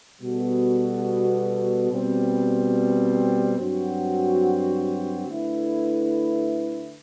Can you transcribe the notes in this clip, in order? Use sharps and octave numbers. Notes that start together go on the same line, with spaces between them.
B2 G3 B3 F#4 A4
B2 G3 C4
G2 F#3 C4 F#4
D3 A3 E4 B4